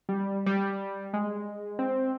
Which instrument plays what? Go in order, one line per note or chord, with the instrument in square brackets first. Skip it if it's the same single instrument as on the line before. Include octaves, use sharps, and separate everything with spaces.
[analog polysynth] G3
G3
G#3
C4